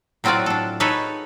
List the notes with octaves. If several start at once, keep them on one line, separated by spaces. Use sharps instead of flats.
A2 F#3 C4 F4 F#4 D5
D4 A4
D#4 G#4 A4 B4 C#5